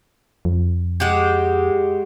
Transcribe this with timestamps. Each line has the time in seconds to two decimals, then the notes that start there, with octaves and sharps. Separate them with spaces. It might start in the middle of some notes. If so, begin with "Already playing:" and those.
0.45 F2
1.00 G#3 F#4 G4